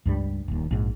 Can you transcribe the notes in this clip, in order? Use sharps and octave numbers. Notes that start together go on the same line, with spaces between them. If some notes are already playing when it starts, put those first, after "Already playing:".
C#2 G2 G3
D#1 D#2
A#1 G#2